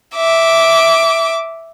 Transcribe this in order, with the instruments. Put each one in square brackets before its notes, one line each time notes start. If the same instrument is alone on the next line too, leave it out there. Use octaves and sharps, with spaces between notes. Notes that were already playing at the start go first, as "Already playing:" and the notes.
[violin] E5 D6